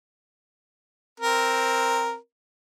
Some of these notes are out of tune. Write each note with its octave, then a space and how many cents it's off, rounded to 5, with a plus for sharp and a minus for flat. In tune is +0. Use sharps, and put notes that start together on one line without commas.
C4 +5 A#4 +0